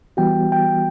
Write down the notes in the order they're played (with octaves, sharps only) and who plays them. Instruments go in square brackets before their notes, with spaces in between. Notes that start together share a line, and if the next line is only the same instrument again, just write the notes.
[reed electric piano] E3 G3 B3 F#4 [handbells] G5
[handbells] G5